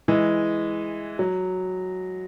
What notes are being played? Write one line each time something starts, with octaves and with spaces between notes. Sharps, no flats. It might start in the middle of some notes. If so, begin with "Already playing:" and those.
E3 G#3
F#3